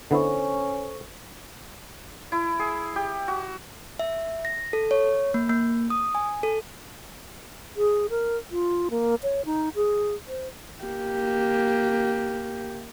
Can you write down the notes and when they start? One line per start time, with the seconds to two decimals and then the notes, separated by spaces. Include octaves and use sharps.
0.11 D3 B3 C#4 E4 A4 C5 C#6
2.32 E4
2.59 G#4
2.96 G4
3.28 F#4
3.99 E5
4.45 A#6
4.73 A4
4.91 C#5
5.34 A#3
5.49 A#3
5.90 D#6
6.15 G#5
6.43 A4
7.77 G#4
8.10 A#4
8.51 F4
8.91 A#3
9.23 C#5
9.45 D#4
9.76 G#4
10.28 C5
10.83 A#3 G4